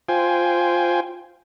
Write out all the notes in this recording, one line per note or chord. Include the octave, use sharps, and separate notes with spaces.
F4 C5 G5 G#5